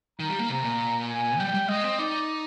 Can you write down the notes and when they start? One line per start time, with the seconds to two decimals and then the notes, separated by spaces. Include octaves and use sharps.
0.19 D#3 A#5
0.29 G3
0.39 A#3
0.49 C3 A#5
0.64 A#2
1.09 G#5
1.39 G3 G5
1.54 G3
1.68 G#3 D#5
1.84 C4
1.99 D#4 D5